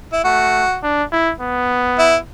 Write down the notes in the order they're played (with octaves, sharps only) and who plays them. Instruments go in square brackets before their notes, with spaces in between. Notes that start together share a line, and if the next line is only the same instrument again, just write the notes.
[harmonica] E4
[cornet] A3 [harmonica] F#4
[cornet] D4
E4
B3
[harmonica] E4